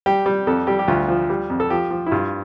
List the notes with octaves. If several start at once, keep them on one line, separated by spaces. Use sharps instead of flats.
G3 G4
G3
F2 A4
G3 G4
G4
D2 F4
F3
G3
F2
A4
F3 G4
F3
E4
G2 F4